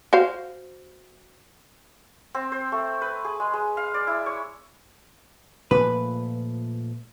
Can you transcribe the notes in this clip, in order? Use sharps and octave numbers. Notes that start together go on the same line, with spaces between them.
F#4 C5 F5
C4
C5
A3
B4
G#4
G#3
G#3
F5
D5
E4
C#5
A#2 F3 A3 B4